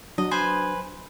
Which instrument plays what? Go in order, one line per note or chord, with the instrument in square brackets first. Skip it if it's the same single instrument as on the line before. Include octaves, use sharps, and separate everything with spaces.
[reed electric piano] F#3 D4 [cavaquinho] D#5
[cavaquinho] B4 C5 G#5